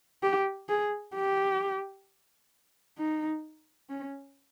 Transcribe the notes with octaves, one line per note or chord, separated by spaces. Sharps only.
G4
G#4
G4
D#4
C#4